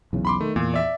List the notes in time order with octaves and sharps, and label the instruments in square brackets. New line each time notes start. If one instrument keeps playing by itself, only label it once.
[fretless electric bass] B1 E2 C#3
[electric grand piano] B5 C6 D6
[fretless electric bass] D#3 [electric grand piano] A3
[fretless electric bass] E2 [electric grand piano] A#2
[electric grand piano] D5 E5